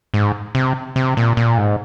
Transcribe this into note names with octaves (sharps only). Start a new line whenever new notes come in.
G#2
C3
C3
A#2
A#2
G#2